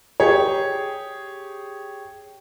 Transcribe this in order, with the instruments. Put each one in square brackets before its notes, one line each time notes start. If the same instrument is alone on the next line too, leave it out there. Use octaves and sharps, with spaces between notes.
[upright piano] G4 G#4 C#5